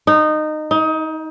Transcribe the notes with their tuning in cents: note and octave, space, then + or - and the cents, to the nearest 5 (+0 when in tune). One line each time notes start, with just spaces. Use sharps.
D#4 -20
D#4 +25